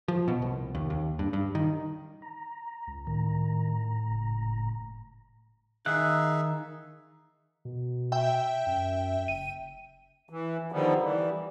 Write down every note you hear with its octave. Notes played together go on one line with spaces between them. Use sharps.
F3
B2
C2
D#2
D#2
G2
G2
D#3
A#5
C#2
A2 D#3 A#5
F#1
D#3 D#4 G#4 E5 F5 F#6
B2
E5 G5
F#2
F#1 D#7
E3
D3 D#3 F3 G3 B3
E3 G3